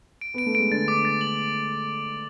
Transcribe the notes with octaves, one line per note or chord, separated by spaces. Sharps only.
D7
B3 D7
A3
G#3 D7
D3 A6
D6
A6
F#7